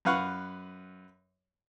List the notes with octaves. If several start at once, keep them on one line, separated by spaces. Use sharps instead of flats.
F#2 B4 F5 F#5 C#6